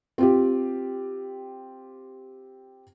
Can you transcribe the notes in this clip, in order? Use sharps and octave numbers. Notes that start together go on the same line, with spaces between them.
C4 F4 G4